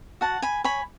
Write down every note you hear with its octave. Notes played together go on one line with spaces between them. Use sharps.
F#4 F#5 A5
G#5 B5
C#5 G#5 B5